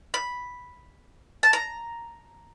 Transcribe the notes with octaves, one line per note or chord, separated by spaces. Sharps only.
B5
A5
A#5